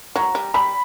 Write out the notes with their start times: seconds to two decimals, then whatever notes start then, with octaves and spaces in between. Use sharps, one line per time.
0.16 F#3 A#5
0.35 G3
0.54 G3 B5